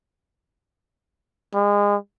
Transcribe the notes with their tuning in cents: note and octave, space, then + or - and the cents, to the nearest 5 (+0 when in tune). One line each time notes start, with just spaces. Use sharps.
G#3 -30